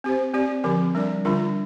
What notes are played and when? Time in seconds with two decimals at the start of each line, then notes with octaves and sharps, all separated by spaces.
0.04 C4 G4 C5
0.34 C4 G4 D5
0.64 D3 F3 C4 G4 A#4
0.95 G3 D4 A#4 D5
1.25 D3 G3 D4 F4 A#4